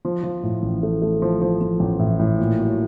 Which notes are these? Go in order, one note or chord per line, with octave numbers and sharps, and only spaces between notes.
F3
F3
A2
A1
A3
A3
F3
F3
F3
A1
A2
A2
A#2
F#3